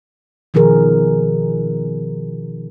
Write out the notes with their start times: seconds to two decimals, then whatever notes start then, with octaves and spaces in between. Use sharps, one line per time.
0.54 B2 D#3 F3 G#4 A#4